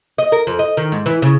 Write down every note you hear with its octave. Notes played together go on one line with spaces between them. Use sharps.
D#5
A#4
F2
D#5
D#3
G#2
E3
C#3